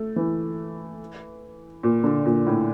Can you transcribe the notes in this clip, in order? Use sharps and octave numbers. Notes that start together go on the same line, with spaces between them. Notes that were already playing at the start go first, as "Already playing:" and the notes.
Already playing: A3
E3
A#2
D3
A#2
A2